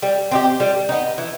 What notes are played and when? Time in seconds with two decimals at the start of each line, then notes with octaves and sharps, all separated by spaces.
0.02 G3
0.31 C4 D#4 G4
0.60 G3
0.89 B3 D#4
1.18 E3